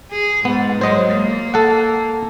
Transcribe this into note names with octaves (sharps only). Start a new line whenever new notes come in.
G#4
G#2 B3
F#3 G#3 C5 D#5
A#3
A4 F#5